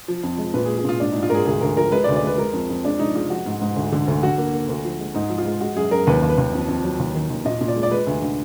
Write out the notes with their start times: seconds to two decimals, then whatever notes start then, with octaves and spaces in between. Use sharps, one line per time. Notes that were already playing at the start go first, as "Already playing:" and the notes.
0.08 F3
0.23 F2
0.38 G#3
0.54 A#2 B4
0.65 G#4
0.69 G#3
0.77 G#4
0.84 A#2 F4
1.00 G#2 D4
1.12 G#2 D#4
1.23 F4
1.30 G#2 G#4 A#4
1.46 D2 G#4
1.61 D2 A#4
1.76 F3 A#4
1.92 G#3 B4
2.04 D5
2.08 D2
2.16 D5
2.23 G#3 B4
2.38 G#3 A#4
2.53 F2
2.70 F2
2.85 G#3 D4
2.99 G#3 D#4
3.15 G#3 F4
3.30 F3 F#4
3.46 G#2
3.61 G#2
3.76 D2
3.92 D3
4.07 D2
4.23 D3 F#4
4.38 A#3
4.54 A#3
4.69 D2
4.84 F3
4.99 G#3
5.15 G#2 D#4
5.30 F3
5.38 F4
5.46 G#3
5.61 G#3 F#4
5.76 F#2 G#4
5.91 F#2 A#4
6.07 D#2 B4
6.23 D#2
6.30 B4
6.38 D#2
6.53 F2
6.68 F2
6.84 F#3
6.99 D#2
7.15 D#3
7.30 D#2
7.45 A#2 D#5
7.61 A#2
7.68 D5
7.76 G#3
7.83 D5
7.91 G#3 B4
8.07 D2
8.22 D3